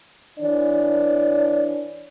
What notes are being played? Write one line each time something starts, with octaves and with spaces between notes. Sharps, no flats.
E3 D4 C#5 D5